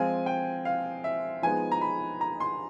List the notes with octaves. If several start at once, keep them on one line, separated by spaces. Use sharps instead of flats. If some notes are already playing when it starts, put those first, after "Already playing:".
Already playing: F3 G#3 C4 F4 G#5
G5
F5
E5
F3 G#3 B3 D#4 G#5
A#5
B5
A#5
C6